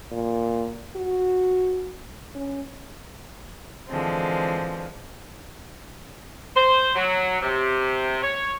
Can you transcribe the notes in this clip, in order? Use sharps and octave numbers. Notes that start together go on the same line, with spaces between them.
A#2
F#4
C#4
D3 E3 F3 G#3 C4
C5
F#3
C3
C#5